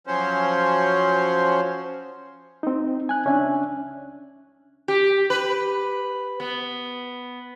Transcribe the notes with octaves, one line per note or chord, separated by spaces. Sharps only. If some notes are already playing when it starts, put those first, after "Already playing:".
F3 F#3 C#4 C5
C4 D#4
G#5 F#6
C#2 C#4 D4 E5 G#5
G4
B4
B3